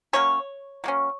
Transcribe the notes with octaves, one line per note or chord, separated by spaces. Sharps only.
F#3 A#3 C#4 C#5
F#3 A#3 C#4